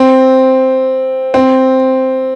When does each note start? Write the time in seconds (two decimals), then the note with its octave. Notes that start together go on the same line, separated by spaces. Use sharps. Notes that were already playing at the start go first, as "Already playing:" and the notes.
Already playing: C4
1.34 C4